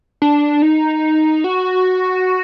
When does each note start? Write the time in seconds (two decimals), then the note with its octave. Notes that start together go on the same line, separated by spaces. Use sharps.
0.22 D4
0.62 D#4
1.44 F#4